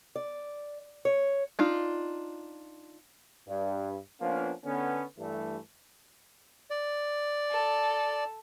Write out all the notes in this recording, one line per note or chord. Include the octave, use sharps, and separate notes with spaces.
D5
C#5
D4 D#4 F4
G2
F3 A#3 B3 C#4 D4 F4
D3 B3 C#4
G2 E3 A3
D5
A4